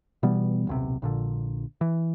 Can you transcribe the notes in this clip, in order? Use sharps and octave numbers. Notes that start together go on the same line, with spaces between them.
B2 E3 G3 B3
D#1 B1 C3
A#1 A#2 D3
E3